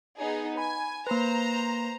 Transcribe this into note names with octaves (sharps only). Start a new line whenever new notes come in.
B3 D#4 G#4
G#5 B5
A#3 B4 C5 A#5